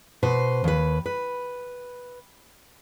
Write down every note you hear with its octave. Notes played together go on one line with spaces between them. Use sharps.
B2 B4 C5
D#2 B4
B4